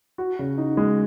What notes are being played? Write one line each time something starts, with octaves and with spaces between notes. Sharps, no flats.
F#4
C#3
D#4
G#3